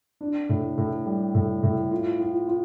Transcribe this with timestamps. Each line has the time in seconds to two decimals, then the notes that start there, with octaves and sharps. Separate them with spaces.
0.21 D4
0.49 A2
0.78 A2
1.06 G3
1.35 A2
1.63 A2
1.92 F4
2.20 F4
2.48 F4